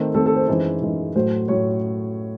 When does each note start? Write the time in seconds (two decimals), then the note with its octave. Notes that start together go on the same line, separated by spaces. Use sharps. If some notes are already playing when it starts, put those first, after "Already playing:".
Already playing: D#3 A3 C4
0.14 D#3 A3 C4 A4
0.26 A4
0.36 C5
0.47 F#2 E3 G#3 D#4 C5
0.81 F#2 E3 G#3 D#4
1.15 A2 F#3 A3 C5
1.48 A2 F#3 A3 C#5